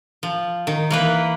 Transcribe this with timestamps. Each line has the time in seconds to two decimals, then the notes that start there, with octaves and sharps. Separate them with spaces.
0.23 F3
0.67 D#3
0.90 E3 A#3 B4